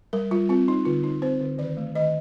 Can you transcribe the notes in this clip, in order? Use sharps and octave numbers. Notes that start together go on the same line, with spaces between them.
G3 A#4
G3 F4
C4 F4
D#4
D3 F4
D#4
C4 C5
D3
D#3 D5
A3
D#3 D#5